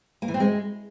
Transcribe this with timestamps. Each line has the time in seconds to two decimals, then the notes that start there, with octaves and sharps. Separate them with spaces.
0.22 A#3
0.28 E3
0.34 C4
0.40 G#3